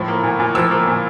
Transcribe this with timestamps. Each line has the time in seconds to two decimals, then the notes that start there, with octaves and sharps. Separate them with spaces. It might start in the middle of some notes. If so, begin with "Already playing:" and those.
Already playing: A2 F3
0.08 A#3
0.24 A#2
0.40 A#2
0.55 F3 E6
0.71 A#3
0.87 A#2